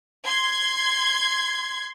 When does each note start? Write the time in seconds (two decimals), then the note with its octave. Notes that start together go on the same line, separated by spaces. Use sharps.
0.25 C6 G#6